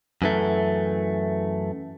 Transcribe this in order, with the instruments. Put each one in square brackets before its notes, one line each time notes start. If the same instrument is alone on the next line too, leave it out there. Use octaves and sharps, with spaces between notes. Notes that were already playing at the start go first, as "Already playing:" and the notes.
[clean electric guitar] F#2 E3 A3